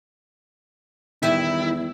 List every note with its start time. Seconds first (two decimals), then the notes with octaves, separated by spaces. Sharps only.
1.23 E2 D#3 G3 E4 E5